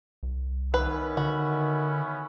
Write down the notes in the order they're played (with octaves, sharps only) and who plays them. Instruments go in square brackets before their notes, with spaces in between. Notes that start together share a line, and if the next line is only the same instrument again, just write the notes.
[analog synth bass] C2
[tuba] D#3 [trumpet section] B3 C#4 E4 [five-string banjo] B4
[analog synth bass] D3 [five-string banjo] F#4